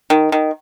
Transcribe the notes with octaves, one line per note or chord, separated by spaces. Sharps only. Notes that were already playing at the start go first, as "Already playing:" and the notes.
D#3
D#3